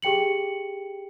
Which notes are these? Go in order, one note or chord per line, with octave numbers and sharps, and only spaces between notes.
G4 G#4 G5 C#7 F#7